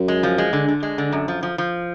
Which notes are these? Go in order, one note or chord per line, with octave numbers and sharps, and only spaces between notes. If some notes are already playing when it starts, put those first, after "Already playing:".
Already playing: F#2
G#3
F3
G#3
D3
D3
G#3
D3
F#2
F3
F3
F3